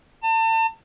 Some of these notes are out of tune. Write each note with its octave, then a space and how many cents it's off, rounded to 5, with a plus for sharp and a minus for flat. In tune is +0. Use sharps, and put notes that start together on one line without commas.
A5 +35